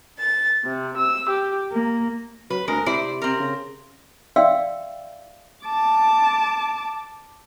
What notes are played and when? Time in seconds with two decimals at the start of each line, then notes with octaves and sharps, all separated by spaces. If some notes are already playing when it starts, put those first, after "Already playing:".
0.18 A6
0.63 C3
0.97 E6
1.29 G4
1.72 A#3
2.50 F#3 B4
2.68 D2 G#3 A#4
2.86 C3 E4 C5 D5
3.22 C4 A#4
3.40 C#3
4.36 D5 E5 F5 G5 C6 E6
5.65 A5 D6